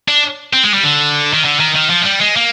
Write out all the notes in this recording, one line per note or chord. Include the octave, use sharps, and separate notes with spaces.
D4
C4
G#3
G3
D3
D#3
D3
D#3
D#3
F3
G#3
G3
G#3
A#3